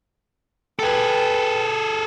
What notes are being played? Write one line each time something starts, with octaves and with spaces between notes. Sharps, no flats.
G#4 A4 B4 G5